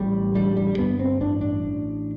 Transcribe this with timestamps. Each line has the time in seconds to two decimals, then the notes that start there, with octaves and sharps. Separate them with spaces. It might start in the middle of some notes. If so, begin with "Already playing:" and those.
Already playing: A1 G3
0.35 D3 G3
0.57 G3
0.78 G2 B3
0.99 C4
1.21 A1 D4
1.41 D4
1.64 A1